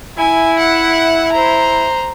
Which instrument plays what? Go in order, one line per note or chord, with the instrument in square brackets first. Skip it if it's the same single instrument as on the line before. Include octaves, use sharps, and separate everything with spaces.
[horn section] E4 [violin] G#5
[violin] F#5
C5 A#5